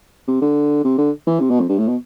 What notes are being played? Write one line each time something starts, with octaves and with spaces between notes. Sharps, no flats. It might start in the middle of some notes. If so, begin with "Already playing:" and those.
C3
D3
C3
D3
E3
C3
B2
F2
G2
A2
B2